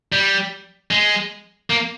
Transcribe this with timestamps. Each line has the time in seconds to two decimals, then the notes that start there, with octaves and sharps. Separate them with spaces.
0.12 G3
0.91 G#3
1.70 A#3